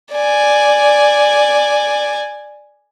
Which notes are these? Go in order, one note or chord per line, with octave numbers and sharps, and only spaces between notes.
D5 G#5